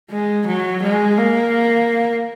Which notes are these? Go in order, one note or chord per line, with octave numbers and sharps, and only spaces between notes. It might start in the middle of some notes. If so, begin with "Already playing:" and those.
G#3
F#3
G#3
A#3